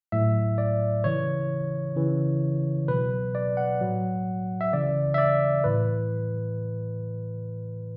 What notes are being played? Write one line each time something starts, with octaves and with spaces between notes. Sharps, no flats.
A2 F#3 E5
D5
C#3 E3 C#5
C#3 E3
B2 F#3 B4
D5
F#5
A2 F#3
E5
C#3 E3 D5
E5
D5
A2 E3 B4